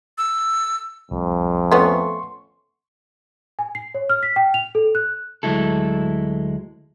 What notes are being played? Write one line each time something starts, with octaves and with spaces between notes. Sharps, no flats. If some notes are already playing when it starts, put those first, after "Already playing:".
E6
C2 F2
A3 B3 C#4 C6 C#6
G#5
C7
C#5
F6
B6
G5
F7
A4
F#6
D2 F#3 G#3 E4 A4